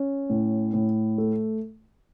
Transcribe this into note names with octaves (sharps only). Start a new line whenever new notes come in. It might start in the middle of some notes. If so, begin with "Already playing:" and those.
Already playing: C#4
A2
A2
A3